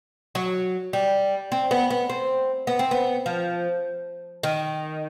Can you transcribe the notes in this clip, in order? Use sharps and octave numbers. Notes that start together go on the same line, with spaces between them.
F#3
G3
C4
B3
B3
C4
B3
C4
B3
F3
D#3